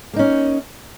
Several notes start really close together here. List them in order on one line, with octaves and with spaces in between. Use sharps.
A#3 D#4 C#4